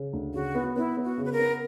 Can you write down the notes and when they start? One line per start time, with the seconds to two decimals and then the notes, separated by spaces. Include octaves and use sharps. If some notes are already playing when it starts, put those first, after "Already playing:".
Already playing: C#3
0.13 D2
0.34 C#3 F#4
0.55 B3
0.76 B3 E4
0.97 B3
1.04 F#4
1.18 C#3
1.25 B4
1.32 A#4
1.39 B3